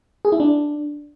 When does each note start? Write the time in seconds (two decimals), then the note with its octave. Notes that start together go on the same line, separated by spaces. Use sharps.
0.25 G#4
0.32 E4
0.40 D4